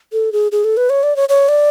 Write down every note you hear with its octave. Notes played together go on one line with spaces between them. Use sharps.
A4
G#4
G#4
A4
B4
C#5
D5
C#5
C#5
D5